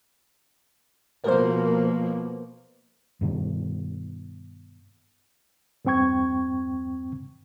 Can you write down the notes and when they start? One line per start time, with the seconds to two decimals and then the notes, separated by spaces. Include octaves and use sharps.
1.24 B2 F3 A#3 A#4 C5
3.21 G2 B2 D#3
5.85 E2 G2 C4 G5 C#6 G#6